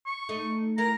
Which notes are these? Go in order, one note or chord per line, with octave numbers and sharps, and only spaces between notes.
C#6
A3 D#4
E4 A#4 A#5